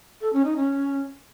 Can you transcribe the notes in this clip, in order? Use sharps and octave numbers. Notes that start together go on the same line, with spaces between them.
A4
C#4
D#4
C#4